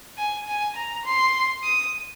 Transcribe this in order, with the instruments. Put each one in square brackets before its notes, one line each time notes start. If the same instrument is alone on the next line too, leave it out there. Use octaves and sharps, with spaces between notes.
[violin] G#5
G#5
A#5
C6
D#6